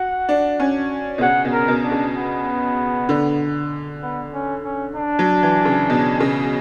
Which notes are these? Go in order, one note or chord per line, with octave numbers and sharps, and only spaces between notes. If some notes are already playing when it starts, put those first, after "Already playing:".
Already playing: F#4 F#5
D4
C#4
B2
C#3 F#5
B2
A#4
B2
D4
C#3
B3
D3
B3
C#4
C#4
D4
F#3
E3
C#3
B2
C#3